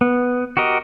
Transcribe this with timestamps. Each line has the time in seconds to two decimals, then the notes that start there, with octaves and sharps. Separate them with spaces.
0.01 B3
0.57 F#4 G4 A#4 D#5